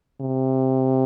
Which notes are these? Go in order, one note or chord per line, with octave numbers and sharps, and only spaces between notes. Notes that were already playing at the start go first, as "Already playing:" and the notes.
C3